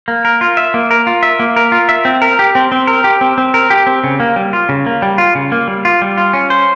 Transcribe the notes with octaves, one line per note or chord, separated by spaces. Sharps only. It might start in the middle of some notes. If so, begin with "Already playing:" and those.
A#3
A#4
F4
E5
A#3
A#4
F4
E5
A#3
A#4
F4
E5
C4
A#4
G4
C4
C4
A#4
G4
C4
C4
A#4
G4
C4
C#3
A#3
G3
F4
C#3
A#3
G3
F4
C#3
A#3
G3
F4
G3
F4
C#4
C5